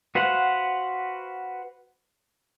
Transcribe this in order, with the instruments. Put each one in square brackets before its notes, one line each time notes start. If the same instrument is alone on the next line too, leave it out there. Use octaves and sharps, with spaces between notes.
[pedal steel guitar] F#4 B4 C5 F5 F#5